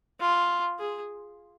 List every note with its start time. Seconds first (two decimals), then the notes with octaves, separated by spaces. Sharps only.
0.20 F4
0.79 G#4